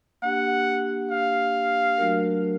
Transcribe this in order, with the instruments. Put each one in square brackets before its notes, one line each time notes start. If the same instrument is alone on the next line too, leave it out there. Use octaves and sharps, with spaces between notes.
[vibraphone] A#3 D4 G4 [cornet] F#5
[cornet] F5
[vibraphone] F#3 A3 D4 F#4 A#4